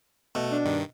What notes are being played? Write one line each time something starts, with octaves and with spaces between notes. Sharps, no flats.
B2 A3
D4
G2 D#3